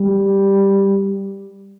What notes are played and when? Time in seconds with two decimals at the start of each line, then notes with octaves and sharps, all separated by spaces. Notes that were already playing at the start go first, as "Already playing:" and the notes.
Already playing: G3